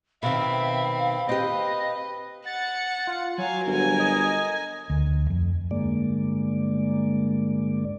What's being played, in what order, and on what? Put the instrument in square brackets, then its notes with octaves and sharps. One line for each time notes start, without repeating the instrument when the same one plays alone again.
[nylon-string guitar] B2 D#3 [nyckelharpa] C4 B5 [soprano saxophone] E5 [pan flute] F5
[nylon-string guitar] C4 G4 [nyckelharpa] B4 [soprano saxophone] D#5
[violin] F#5 C#7 [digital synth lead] A6
[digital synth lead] F4
[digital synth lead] F#3 [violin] F5 G#5
[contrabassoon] G1 [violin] A#4 G#5
[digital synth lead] D#5
[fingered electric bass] D2
F2
[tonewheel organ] G2 D3 G#3 A#3 D5